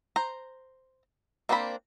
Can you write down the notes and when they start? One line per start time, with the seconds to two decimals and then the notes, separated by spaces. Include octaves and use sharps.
0.16 C5 A#5
1.49 A#3 C4 D4 C5 B5